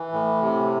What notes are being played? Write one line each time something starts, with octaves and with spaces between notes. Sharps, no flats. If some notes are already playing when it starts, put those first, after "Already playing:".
Already playing: E3
A2
C3